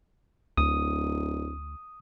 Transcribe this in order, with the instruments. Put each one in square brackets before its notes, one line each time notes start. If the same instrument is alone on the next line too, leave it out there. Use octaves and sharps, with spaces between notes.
[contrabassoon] D1 [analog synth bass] D2 [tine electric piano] D#6